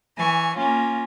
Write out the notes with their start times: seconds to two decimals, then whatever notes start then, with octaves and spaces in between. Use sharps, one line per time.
0.17 E3 G#5 C#6
0.56 A#3 C#4 F4